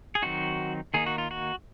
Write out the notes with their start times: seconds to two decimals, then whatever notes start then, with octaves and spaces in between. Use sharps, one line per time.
0.15 G#4
0.22 D#3 F#3 C4 D#4 F#4
0.94 D#3 A#3 D#4 G#4
1.06 F#4
1.18 F4
1.31 F#4